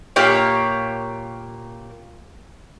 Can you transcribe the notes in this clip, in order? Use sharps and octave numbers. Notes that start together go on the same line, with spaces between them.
A#2 A#3 G4 C#5